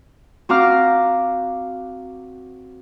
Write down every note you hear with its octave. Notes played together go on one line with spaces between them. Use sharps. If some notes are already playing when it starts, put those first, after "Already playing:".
C4 F#4 F5 A#5 D6 F6